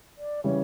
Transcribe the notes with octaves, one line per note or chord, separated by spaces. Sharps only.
D5
C#3 E3 G3 C#5